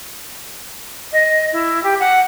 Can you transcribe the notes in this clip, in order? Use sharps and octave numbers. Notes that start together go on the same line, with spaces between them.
D#5
E4
G4
F#5